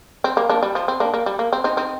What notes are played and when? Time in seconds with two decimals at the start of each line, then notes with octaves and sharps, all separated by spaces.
0.24 C4
0.37 A#3
0.49 A#3 D4
0.63 G3
0.75 F3
0.88 C4
1.00 A#3 D4
1.14 A#3
1.26 G3
1.39 A#3
1.53 C4
1.64 C4 D#4
1.77 C4 D#4